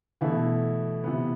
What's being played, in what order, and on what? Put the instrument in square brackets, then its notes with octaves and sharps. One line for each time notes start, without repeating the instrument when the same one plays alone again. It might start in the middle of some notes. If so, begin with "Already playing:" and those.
[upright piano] B2 E3 A3 E4
C3 E3 B3